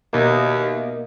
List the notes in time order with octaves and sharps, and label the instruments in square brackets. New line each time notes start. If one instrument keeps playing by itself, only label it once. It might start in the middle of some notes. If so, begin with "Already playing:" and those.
[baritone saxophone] D#2 [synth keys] B2 D#5 E5 [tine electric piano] A#3